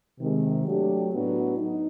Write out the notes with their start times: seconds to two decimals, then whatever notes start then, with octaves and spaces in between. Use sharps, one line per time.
0.20 C3 D#3 G#3
0.66 F#3 A3 D4 G4
1.12 A2 F#3 B3 D4
1.58 D#4